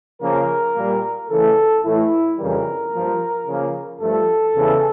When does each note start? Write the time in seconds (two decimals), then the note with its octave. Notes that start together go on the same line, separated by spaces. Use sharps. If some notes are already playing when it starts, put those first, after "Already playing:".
0.21 C#3 F3 A#3 A#4
0.75 A#2 G3 A#3
1.29 C#3 E3 A3 A4
1.83 A2 E3 A3 E4
2.37 F2 C#3 E3 G3 A#4
2.92 G2 F3 A#3
3.46 C#3 F3 A#3
4.00 G2 F3 A3 A4
4.54 E2 C#3 E3